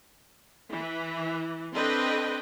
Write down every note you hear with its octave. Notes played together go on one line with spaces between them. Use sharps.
E3
C4 D4 A4 B4 D#5 G5